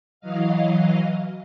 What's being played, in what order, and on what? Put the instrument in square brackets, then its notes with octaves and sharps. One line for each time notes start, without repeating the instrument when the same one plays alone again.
[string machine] E3 F#3 D#5 F5